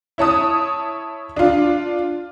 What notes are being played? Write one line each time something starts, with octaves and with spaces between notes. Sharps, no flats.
E4 C#5 A5 D#6
D4 F4